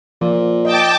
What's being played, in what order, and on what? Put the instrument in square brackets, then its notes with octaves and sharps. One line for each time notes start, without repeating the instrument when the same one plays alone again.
[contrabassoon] A#2 [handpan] F3
[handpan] D#5 [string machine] G5 A5 D6